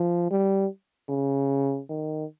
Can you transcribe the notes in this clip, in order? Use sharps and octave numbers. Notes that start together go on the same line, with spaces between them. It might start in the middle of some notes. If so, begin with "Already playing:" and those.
Already playing: F3
G3
C#3
D#3